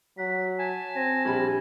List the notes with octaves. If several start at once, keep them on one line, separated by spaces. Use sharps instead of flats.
F#3 F#5 B6
G#5 A5
C4 A#6
A#1 G3 B5 G#6